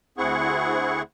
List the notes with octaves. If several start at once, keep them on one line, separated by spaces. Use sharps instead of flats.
D2 C4 E4 G#4 F#5 C#6